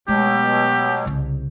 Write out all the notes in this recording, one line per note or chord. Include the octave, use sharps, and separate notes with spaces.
B2 F#3 G#3 A3 G4
C2 C#3